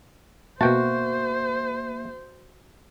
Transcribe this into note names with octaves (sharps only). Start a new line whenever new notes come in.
B2 A#3 F#4 C5 E5 G5 A5